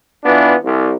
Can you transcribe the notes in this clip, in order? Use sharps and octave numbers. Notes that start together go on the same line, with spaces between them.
E3 B3 D4 F4
C2